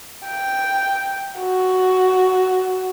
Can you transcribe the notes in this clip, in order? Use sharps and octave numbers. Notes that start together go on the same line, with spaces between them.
G5
F#4